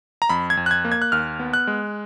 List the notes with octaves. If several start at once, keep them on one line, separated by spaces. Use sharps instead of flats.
A#5
F2 B5
G#6
F2
F#6
G#6
A#3
G#6
F#6
D#2 F6
B3
F#6
G#3